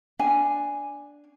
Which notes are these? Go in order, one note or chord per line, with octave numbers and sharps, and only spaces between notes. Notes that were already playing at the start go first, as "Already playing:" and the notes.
D4 G#5